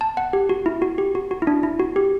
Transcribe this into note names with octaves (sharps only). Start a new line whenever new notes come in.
A5
F#5
G4
F#4
E4
F#4
G4
F#4
F#4
E4
D4
E4
F#4
G4